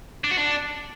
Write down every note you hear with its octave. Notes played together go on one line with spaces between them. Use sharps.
D4
F#4
D4